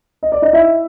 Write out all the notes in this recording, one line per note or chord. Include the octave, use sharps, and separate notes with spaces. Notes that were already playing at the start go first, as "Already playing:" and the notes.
D#5
D5
D#4 D#5
E4 E5